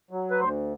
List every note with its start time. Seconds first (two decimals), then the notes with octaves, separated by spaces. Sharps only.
0.11 F#3
0.31 B4
0.40 D2 C5